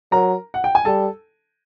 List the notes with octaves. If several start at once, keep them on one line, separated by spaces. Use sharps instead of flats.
F#3 A#4 A#5
F#5
G5
G#5
G3 A4 A5